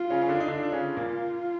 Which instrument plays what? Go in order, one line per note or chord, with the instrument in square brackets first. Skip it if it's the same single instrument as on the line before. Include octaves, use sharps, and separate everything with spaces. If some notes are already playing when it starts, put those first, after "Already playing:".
Already playing: [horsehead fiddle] F4
[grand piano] C#3 C#4
C#4
D3 D4
D#4
[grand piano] D3 D4 [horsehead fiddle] F4
[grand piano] D4
C#3 C#4
A#2 A#3